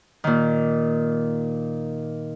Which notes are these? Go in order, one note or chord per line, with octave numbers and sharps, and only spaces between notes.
A#2 D#3